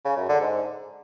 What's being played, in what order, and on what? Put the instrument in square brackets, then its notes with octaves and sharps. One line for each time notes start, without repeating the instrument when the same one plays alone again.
[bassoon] C#3
F#2
D3
G#2